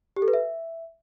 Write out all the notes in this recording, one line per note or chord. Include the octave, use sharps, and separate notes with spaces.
G4
A4
B4
E5